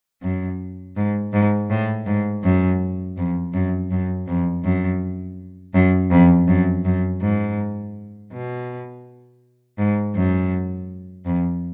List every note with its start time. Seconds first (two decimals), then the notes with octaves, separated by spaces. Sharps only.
0.22 F#2
0.96 G#2
1.33 G#2
1.70 A2
2.06 G#2
2.43 F#2
3.17 F2
3.53 F#2
3.91 F#2
4.27 F2
4.64 F#2
5.74 F#2
6.11 F2
6.48 F#2
6.85 F#2
7.21 G#2
8.32 B2
9.78 G#2
10.16 F#2
11.26 F2